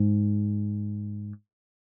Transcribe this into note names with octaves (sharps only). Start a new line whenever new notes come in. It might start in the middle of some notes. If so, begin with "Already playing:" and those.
Already playing: G#2